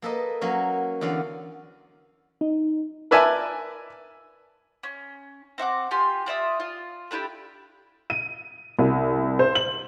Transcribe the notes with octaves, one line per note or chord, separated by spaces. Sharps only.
A#3 A4 B4 D#5
F#3 A#3 C#4
E2 D3 C#4 D5 F5
D#4
A#4 B4 D5 E5 G#5 A5
C#4
C4 E5 F#5 D6
F4 G4 G#5 C6
F4 D5 E5 D#6
F4
A3 D4 E4 G4
D#7
C2
C5
F#7